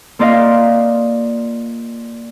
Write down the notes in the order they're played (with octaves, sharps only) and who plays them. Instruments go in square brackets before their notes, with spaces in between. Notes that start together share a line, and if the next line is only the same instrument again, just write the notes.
[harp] A#3 F4 D5 D#5 F5